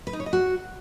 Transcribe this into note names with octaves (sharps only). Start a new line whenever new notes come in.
B4
D#4
C#5
D#5
F#4